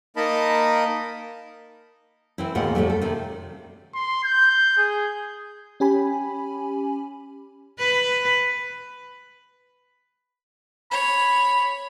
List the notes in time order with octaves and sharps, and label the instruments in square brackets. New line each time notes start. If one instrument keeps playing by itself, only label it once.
[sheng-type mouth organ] A#3 D#4 A#4 D#5 A5 B5
[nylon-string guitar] E3 C4 E4
D#2 G#2 B2 A#3 F4 F#5
F2 A2 C3 G3 A3
A4
C3 D#3
[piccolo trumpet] C6
G6
G#4
[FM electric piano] C#4 G4 G#5 B5
[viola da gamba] B4
[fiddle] C#5 [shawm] B5